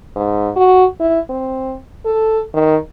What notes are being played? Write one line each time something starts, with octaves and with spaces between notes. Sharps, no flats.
G#2
F#4
E4
C4
A4
D#3